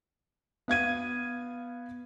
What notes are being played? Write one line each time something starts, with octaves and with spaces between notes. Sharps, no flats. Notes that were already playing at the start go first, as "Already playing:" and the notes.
B3 F5 G#6 D#7